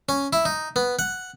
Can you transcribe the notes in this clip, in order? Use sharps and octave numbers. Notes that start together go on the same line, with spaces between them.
C#4
E4
D#4
B3
F#5